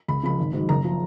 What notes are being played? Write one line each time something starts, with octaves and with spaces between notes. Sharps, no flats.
C#2 B5
C#3 F3 B5
G#1
G#2 D#3 F#3
F#1 A#5
F3